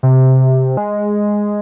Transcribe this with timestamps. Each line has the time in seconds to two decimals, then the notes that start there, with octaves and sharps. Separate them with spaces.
0.03 C3
0.77 G#3